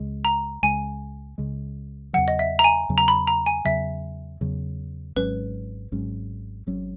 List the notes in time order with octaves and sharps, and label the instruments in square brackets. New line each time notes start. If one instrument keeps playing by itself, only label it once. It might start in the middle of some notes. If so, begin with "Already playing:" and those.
Already playing: [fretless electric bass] C#2 C#3 G#3
[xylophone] A#5
[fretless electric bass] C#2 C#3 G#3 [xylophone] G#5
[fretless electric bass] C#2 C#3 G#3
[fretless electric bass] E2 C#3 F#3 [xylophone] F#5
[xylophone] D#5
E5
A#5
G#5
[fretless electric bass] E2 C#3 F#3
[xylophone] A#5
B5
A#5
G#5
[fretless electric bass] E2 C#3 F#3 [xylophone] E5
[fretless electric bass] E2 C#3 F#3
[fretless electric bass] G#1 G#2 F#3 C#4 [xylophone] B4
[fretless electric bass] G#1 G#2 F#3 C#4
G#1 G#2 F#3 C#4